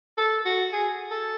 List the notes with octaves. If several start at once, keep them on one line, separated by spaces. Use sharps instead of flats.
A4
F#4
G#4
A4